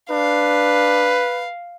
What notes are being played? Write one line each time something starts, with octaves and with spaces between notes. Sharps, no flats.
D4 B4 F5